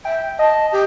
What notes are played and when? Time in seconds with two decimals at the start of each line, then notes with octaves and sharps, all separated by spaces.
0.05 E5 G5
0.39 D#5 A5
0.72 G4